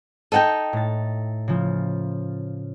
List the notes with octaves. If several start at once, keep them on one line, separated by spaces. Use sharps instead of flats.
D#4 A4 D#5 F#5 G5
A2 A6
C#3 F3